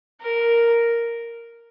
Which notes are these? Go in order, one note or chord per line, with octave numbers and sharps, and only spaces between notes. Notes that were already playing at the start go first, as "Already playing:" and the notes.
A#4